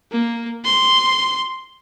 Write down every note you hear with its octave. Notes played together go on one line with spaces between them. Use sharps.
A#3
C6